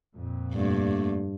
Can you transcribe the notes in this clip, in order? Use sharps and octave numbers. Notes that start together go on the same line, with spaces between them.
F2 A#2
G2 D3 A3 A#3